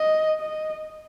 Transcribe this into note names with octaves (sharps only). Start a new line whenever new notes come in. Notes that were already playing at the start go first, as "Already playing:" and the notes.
Already playing: D#5
D#5